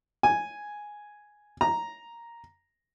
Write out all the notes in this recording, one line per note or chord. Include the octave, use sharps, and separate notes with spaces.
G#5
A#5